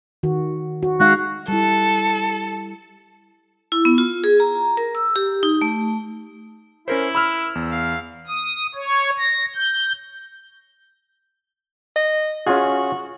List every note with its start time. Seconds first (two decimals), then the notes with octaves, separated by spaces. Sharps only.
0.23 D#3 F#4
0.83 F#4
1.00 G#3 D#4 F#4 F5
1.48 G3 E4 A4
3.72 E4
3.85 B3
3.98 F4
4.24 G#4
4.40 A#5
4.77 A#4
4.95 E6
5.16 G4
5.43 D#4
5.62 A3
6.88 C#4 E4 A#4 C5
7.15 B5 E6 F6
7.55 E2
7.71 F5
8.27 D#6
8.75 C#5
9.18 A#6
9.55 G6
11.96 D#5
12.46 C#4 F4 F#4 G#4